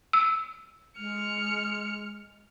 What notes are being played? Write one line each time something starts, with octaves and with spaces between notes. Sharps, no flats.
E6
G#3 F6 C#7